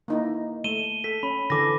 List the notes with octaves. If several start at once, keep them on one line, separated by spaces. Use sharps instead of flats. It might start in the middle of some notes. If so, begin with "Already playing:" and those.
A#3 D#4 E4
A3 D#7 E7 G7
A4 B6
C#4 B5
D3 E3 A4 D6 A#6